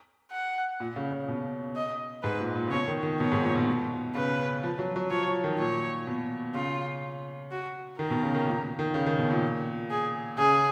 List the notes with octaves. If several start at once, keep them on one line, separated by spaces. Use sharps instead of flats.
F#5
A#2
C#3
C#3
B2
D#5
G#2 B4
A#2
A#2
C#3
B2 C#5
D#3
D#3
B2 C#5
G#2
A#2
B2
B2
C#3 B4
F3
F#3
F#3
F3 C#5
F3
D#3
A#2 C#5
B2
C#3 F4
F#4
D#3 A#4
B2
C#3
D#3
A#2
D#3
C#3
D#3
B2
A#2
G#4
C#3 G#4